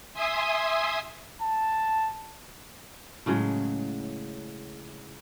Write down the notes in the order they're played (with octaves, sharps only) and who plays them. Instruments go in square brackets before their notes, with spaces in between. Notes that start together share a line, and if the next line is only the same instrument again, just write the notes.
[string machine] E5 G#5 C6 D#6
[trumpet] A5
[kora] A2 C#3 F#3 G#3